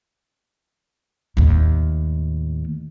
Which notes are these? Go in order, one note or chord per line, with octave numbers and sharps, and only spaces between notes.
D#2 A2